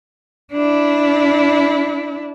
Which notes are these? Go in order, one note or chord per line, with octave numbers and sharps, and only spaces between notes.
D4 E4